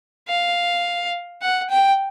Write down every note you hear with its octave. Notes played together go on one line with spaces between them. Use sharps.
F5
F#5
G5